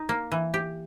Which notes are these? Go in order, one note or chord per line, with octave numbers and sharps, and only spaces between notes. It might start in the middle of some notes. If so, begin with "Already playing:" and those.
Already playing: D#4
A#3
E3
G4